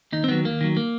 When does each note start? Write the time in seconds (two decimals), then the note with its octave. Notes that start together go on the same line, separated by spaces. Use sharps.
0.12 D#2 D#4
0.24 C4
0.28 D#3 F#3 B3
0.45 D#2 A#3
0.61 D#3 F#3
0.77 A#3